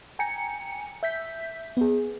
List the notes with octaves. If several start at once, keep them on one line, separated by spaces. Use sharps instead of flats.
G5 G#5 A#5 C#7
E5 G6 B6
B3 G#4